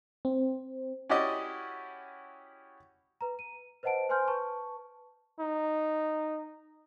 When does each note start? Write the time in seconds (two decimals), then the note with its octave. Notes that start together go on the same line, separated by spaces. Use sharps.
0.25 C4
1.10 C#4 E4 F#4 G4 D5 D#5
3.21 B4 A#5
3.39 D#7
3.83 B4 C5 D#5 F#5 A5 D7
4.09 B4 C5 G#5 C6 F6 G6
4.28 B4 A5 C#6
5.40 D#4